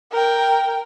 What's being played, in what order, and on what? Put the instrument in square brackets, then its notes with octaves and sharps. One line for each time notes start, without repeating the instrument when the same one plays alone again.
[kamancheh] A#4 G5